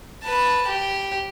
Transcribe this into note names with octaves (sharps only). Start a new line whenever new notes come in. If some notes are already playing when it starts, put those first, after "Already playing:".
B4 A5
G4